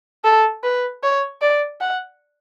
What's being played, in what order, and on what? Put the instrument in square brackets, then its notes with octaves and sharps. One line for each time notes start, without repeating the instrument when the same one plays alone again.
[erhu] A4
B4
C#5
D5
F#5